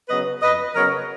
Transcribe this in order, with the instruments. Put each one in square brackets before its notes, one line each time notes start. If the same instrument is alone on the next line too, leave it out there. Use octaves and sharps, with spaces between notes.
[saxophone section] C#3 F#3 B3 B4 D#5
F2 B4 D#5
C#3 F#3 B3 A#4 C#5